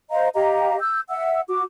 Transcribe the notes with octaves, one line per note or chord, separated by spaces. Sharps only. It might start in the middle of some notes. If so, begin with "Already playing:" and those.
C5 D#5 F5 A#5
G4 D#5 F5 A#5
E6 G6
E5 F#5 E6
F#4 D6